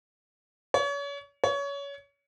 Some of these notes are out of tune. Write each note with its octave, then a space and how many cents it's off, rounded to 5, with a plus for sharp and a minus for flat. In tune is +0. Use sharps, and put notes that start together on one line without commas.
C#5 +35
C#5 +25